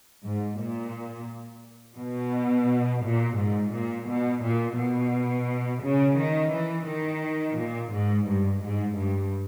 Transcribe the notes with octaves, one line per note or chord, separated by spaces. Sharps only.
G#2
A#2
B2
A#2
G#2
A#2
B2
A#2
B2
C#3
D#3
E3
D#3
A#2
G#2
G2
G#2
G2